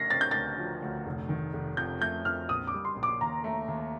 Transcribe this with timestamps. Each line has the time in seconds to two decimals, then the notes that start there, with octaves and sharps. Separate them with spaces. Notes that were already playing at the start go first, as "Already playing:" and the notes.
Already playing: A3 A#6 C7
0.10 C4 A6
0.21 G6
0.31 D2 A6
0.58 F3
0.82 D2
1.06 F1
1.29 D#3
1.53 F1
1.77 F2 G6
2.01 A3 G6
2.25 F2 F6
2.49 A#1 D#6
2.67 D6
2.74 G3
2.85 C6
2.96 A#1
3.03 D6
3.21 D#2 A#5
3.44 A3
3.68 D#2